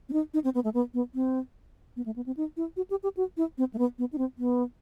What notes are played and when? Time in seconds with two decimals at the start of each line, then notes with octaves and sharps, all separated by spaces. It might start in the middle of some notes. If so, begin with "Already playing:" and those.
0.09 C4
0.13 D#4
0.34 D#4
0.44 C4
0.55 B3
0.64 A3
0.74 B3
0.94 B3
1.15 C4
1.96 B3
2.06 A3
2.16 B3
2.26 C4
2.37 D#4
2.57 E4
2.77 F#4
2.90 G4
3.03 G4
3.17 F#4
3.37 E4
3.58 C4
3.74 A3
3.78 B3
3.99 B3
4.13 D#4
4.18 C4
4.38 B3